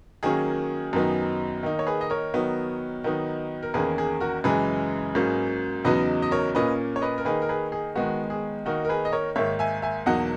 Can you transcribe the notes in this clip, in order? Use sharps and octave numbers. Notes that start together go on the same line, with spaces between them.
D#3 F#3 A#3 C#4 G#4
F#2 D#3 F#3 B3 D#4
D#3 A#3 D#4
C#5
G#4 B4
D#5
A#4 C#5
D#3 F#3 B3 D#4
D#3 F#3 B3 D#4
A#4
E2 D#3 A#3 C#4 G#4 B4
G#4
F#4 A#4
F#2 C#3 E3 G#3 G#4 B4
G#2 F#3 A#3 C#4
E2 C#3 F#3 B3 D#4 B4 D#5
D#5
A#4 C#5
A#2 A#3 C#4 B4 D#5
C#5
B4 D#5
A#4
D#3 A#3 D#4 G#4 B4
A#4
G#4 B4
G#4
D#3 G#3 B3 F#4
G#4
D#3 A#3 D#4 F#4 A#4
A#4
G#4 B4
D#5
A#4 C#5
G#2 D#3 A#3 C#5 E5
E5 G#5
E5 G#5
E2 B2 F#3 A#3 D#4 D#5 F#5